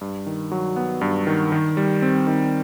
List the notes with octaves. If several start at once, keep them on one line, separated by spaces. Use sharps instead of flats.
G2
D#3
F#3
B3
G2
D#3
D#3
G3
C4
D#3